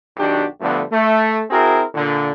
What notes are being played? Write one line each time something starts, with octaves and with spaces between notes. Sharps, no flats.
B1 D#3 D4 F#4 G4
G2 D3 F3 A3 B3
A3
C4 E4 F#4 G#4 A#4
A#2 D3